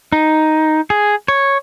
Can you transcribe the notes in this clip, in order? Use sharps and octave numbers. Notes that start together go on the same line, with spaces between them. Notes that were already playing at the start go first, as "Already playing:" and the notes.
D#4
G#4
C#5